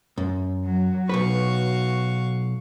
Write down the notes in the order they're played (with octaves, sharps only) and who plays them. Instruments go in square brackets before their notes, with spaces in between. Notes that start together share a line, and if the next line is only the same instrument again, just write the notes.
[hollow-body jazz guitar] F#2
[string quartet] F#3
[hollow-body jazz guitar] B1 E2 B4 [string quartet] F#4 F5 C#6